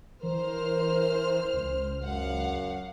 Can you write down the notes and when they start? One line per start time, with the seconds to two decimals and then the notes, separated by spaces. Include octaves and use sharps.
0.23 E3 A#4 C5 F6
1.54 C#2
2.04 F#2 F5 F#5